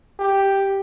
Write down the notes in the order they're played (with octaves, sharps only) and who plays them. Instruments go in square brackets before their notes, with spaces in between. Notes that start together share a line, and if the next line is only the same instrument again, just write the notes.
[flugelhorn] G4